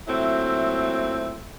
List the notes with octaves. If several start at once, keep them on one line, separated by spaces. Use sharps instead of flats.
A#2 F#3 A3 C4 E4